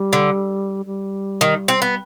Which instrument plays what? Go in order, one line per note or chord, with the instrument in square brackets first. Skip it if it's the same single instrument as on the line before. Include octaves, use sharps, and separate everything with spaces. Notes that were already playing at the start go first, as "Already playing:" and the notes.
Already playing: [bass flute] G3
[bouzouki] D3
[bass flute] G3
[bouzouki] D#3
C4
B3